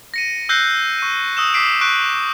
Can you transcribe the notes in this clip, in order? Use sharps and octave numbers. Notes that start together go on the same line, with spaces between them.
A#6 C#7 D#7
E6 F#6 G6 A#6 C7
C#6 D#7
D#6 E6 E7
D6 D#6 B6 C7 D7
C#6 F#6 D7